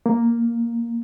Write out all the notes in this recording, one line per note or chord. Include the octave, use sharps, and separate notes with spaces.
A#3